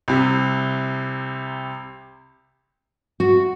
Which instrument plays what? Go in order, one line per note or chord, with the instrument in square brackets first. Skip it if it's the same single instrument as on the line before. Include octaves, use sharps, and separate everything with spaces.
[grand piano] C2 C3
[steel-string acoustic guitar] F#4